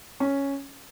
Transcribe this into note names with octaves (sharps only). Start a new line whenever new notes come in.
C#4